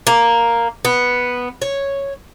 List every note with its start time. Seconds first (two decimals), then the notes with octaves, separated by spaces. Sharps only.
0.07 A#3
0.85 B3
1.62 C#5